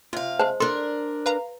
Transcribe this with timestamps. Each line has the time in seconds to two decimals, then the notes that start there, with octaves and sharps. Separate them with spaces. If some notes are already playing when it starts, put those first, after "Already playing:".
0.13 C3 F4 F5
0.39 G#3 C5 A5
0.60 D4 A4 A#4 C6
1.26 B4 F5 A#5